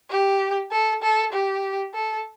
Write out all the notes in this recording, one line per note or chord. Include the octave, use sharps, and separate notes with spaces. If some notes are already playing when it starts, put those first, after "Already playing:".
G4
A4
A4
G4
A4